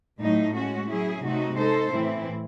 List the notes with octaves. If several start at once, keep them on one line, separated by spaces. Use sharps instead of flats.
A2 F#3 A3 D#4
G#3 C#4 F#4
F#3 C#4 E4 G#4
C3 F#3 A3 D#4 F#4
G#3 D#4 A4 C5
A2 E3 C4 E4